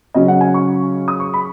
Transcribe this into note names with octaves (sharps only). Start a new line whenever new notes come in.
C#3 F#3 C#4 D#5
F#5
G#5
C#6
D#6
C#6
B5